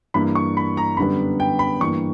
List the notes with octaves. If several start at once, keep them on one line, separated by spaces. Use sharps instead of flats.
G2 E3 A#3 E4 B5
C#6
B5
A#5
F#2 D3 G3 B3 B5
G5
B5
G2 E3 A#3 C#6